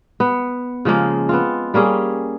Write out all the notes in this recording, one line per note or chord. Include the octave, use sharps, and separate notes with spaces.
B3
C#3 F3 G#3 A#3
B3 C4 F4
G3 A#3 C#4 G#4